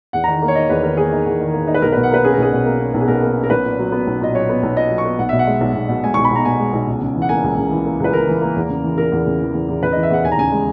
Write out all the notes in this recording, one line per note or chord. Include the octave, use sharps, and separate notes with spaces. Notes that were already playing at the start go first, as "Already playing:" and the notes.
E2 F#5
D#3 A#5
A#3
C#5
D#4 D#5
E2 B4
D#3 A#4
A#3 G#4
D#4
E2
D#3
A#3
D#4
B4
B1 A#4
B2 B4
F#5
A#3 B4
C#4 G#4
A#4
B1 G#4
B2
A#3
C#4
B1
G#4
B2 A#4
A#3
C#4
A#4
B1 B4
A#2
F#3
B3
B1
A#2 D#5
F#3 C#5
B3
B1
A#2 D#5
F#3
C#6
B3
B1 F#5
B2 E5
F#5
G#3
B1
B1
B2
G#3 G#5
B1 C#6
B5
B1 A#5
B2 G#5
G#3
B1
C#2
C#3
E3
F#5
A#3 G#5
C#2
C#3
E3
A#3
C#2 B4
C#3 A#4
E3
A#3
E2
C#3
E3
E2 A#4
E2
C#3
E3
E2
E2
C#3 B4
E3 D#5
E5
E2 F#5
D#2 G#5
A#5
C#3 G#5
G#3